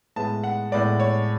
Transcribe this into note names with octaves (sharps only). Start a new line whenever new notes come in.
A2 G#3 B3 A5
F#5
A2 G#3 B3 D5
C#5